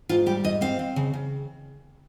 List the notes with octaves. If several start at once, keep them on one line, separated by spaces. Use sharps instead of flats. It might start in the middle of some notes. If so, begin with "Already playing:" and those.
G#2 F4
G3 G4
G#2 D#5
C4 F5
C4
C#3
C#3